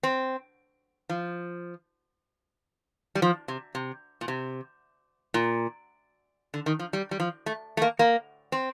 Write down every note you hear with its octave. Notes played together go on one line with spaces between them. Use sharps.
C4
F3
G3
F3
C3
C3
A#2
C3
A#2
D3
D#3
F3
G3
G3
F3
A3
A3
A#3
A#3
C4